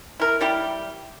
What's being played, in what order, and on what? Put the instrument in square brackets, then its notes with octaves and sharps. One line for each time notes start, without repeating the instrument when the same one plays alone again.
[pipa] E4 A#4
G3 E4 G4